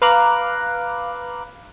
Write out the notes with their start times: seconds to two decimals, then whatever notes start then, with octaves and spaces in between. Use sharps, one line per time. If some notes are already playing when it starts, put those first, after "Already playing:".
0.02 B4 F5 A#5 D6 F#6